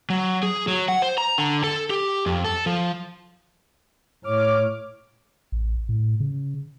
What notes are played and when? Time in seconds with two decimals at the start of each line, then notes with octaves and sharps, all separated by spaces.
0.10 F#3
0.43 G#4
0.68 F#3
0.88 F#5
1.02 C5
1.18 A#5
1.38 D3
1.64 A4
1.90 G4
2.26 F2
2.44 A4
2.66 F3
4.24 A2 C#5 D6 F6
5.52 A1
5.89 A2
6.20 C#3